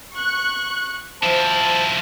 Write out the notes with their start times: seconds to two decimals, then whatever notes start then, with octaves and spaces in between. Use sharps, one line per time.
0.14 C#6 F#6
1.23 F3 E4 C5 A5